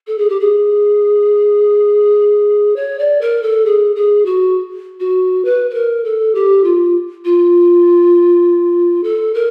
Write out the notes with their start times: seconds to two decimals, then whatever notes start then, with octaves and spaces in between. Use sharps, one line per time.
0.07 A4
0.18 G#4
0.29 G4
0.40 G#4
2.76 C#5
2.99 D5
3.21 A#4
3.43 A4
3.65 G#4
3.96 G#4
4.25 F#4
5.00 F#4
5.45 B4
5.70 B4
5.74 A#4
6.04 A4
6.35 G4
6.64 F4
7.25 F4
9.04 A4
9.34 A#4